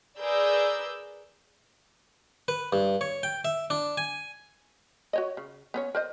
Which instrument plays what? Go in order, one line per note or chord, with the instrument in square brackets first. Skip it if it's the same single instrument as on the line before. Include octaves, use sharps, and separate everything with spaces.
[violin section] G#4 A#4 B4 D5 E6 G6
[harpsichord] B4
G2
C#5
G5
E5
D4
G#5
[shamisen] F#4 C#5 D#5
C#3
B3 C#4 C#5
A#4 C5 D#5